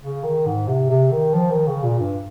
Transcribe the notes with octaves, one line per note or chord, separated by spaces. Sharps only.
C#3
D#3
G#2
C3
C3
D#3
F3
D#3
C#3
A#2
G2